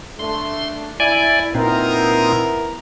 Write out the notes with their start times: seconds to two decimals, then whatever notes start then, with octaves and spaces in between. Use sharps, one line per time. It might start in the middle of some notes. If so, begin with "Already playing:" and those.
0.19 A3 D4 C6
1.00 E4 D5 G#5
1.55 A#2 B3 C4 D#4 E4 A#4